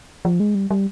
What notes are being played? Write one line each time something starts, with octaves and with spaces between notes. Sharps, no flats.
F3
G#3
G3
G3